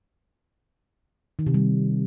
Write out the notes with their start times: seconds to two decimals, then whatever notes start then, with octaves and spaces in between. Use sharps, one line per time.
1.39 D#3
1.47 C3
1.54 G3